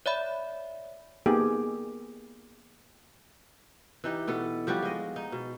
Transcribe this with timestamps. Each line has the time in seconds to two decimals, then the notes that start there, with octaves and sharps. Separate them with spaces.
0.06 C#5 D5 E5 B5
1.26 A#3 B3 D#4 G4 G#4
4.04 E3 D#4 G4
4.27 B2 B3 A4
4.67 F3 G3 F#4 G4
4.82 G#3 D#5
5.16 D#4
5.32 B2